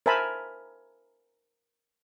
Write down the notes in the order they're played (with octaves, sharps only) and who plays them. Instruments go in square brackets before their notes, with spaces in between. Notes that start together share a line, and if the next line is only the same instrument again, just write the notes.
[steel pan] A#4 C5 E5 G#5 A5 B5